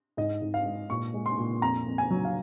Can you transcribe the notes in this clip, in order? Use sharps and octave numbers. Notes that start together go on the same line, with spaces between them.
G#2 D#5
G#2
F5
G#3
A#2 C#6
G#3
C6
A#2
F2 A#5
F2
G#5
F#3
F5